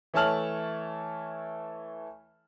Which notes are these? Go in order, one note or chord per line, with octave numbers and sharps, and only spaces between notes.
E3 A3 C#5 A5 F6 F#7